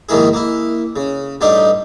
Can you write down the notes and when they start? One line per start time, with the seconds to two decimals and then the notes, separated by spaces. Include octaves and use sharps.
0.09 A#1 G#2 D#3 A#3 E4 G#4
0.33 A#3 E4
0.96 C#3
1.41 A1 G2 G3 D#4 G4 D#5